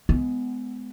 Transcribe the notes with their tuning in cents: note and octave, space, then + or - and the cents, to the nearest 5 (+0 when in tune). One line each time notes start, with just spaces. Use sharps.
G#3 +20 B3 +20